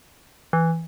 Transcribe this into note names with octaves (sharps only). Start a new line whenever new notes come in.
E3